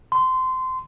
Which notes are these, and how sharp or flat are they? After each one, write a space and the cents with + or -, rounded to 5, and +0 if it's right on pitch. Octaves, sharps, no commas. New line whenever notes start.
C6 -20